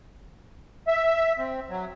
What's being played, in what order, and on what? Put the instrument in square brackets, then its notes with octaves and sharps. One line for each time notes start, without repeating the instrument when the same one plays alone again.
[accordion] E5
C4
F#3